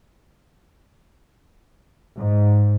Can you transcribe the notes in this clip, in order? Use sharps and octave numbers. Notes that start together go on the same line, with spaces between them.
G#2